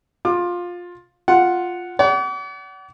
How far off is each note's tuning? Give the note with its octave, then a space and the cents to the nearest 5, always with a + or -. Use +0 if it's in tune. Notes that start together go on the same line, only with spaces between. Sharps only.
F4 +15 D6 +35
F4 +5 F#5 +0
D5 -40 F#5 +35